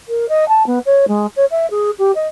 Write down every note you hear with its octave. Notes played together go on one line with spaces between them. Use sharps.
A#4
D#5
A5
B3
C#5
G#3
C#5
E5
G#4
G4
D#5